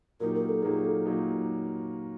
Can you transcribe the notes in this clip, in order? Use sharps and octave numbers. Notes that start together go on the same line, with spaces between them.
A#2 F#3 A#3 D#4 G4 A#4
A#4
A4
A#2 F#3 A#3 D#4 G4 G#4
A4
A#2 F#3 A#3 D#4 G4